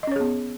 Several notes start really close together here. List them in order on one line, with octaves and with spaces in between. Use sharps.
D#5 C#4 C#5 G#4 B3